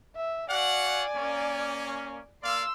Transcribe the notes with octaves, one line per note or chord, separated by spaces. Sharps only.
E5
F#4 D5 F5 F#5 G#5
A#3 C#4
A#3 D5 F5 C6 E6